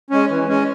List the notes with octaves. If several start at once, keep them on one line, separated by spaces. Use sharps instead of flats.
G#3 C#4
E3
G#3 C#4